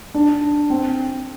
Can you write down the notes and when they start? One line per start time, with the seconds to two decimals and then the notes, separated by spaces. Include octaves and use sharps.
0.14 D4
0.70 C4